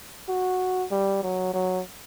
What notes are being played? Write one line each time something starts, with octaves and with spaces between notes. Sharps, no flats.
F#4
G3
F#3
F#3